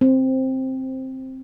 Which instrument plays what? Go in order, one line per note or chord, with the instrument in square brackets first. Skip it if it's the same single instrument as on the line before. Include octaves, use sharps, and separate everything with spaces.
[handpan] C4